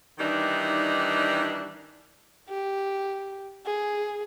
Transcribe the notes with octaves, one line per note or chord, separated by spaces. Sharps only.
D#3 E3 G3 D4 D#4
G4
G#4